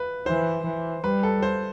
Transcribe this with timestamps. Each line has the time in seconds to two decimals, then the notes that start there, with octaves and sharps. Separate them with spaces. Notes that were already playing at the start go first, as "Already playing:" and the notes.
Already playing: B4
0.26 E3 C5
0.64 E3
1.04 G3 B4
1.23 A4
1.43 C5